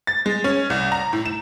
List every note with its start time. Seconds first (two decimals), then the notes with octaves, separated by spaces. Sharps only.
0.07 A6
0.26 G#3
0.44 C#4
0.70 C2
0.92 A#5
1.13 A2
1.26 E7